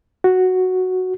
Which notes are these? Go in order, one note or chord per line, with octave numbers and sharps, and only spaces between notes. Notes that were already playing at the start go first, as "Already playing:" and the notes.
F#4